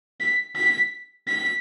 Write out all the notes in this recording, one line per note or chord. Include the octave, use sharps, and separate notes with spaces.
B6
B6
B6